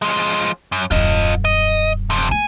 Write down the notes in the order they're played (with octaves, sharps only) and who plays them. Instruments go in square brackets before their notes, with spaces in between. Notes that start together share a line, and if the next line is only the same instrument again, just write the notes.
[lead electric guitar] F3 G#3
F#2
[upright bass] D#1 F#2 [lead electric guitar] F4 D#5
[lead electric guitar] D#5
F2 C3
[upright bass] A3 [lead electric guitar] G#5